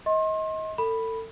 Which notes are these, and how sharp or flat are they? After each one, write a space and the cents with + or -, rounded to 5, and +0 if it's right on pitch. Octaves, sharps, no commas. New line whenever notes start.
D#5 +30 C6 +35
A4 +35 B5 +0